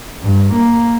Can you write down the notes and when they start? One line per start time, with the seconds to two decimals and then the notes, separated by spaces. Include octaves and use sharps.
0.23 G2
0.53 A#3